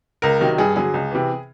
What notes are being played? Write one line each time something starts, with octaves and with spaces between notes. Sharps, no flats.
C#2 A#4
C3 D#3 F#3
G2 G#4
D3 F#3 G#4
C#2
C3 E3